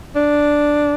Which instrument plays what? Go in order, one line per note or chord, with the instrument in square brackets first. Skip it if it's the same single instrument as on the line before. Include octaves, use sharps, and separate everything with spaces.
[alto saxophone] D4